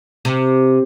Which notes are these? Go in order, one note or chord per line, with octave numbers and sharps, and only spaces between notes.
C3